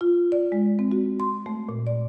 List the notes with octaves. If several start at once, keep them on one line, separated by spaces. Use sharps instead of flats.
F4
D5
G#3
C4
F#4
C6
A3
A#2
D5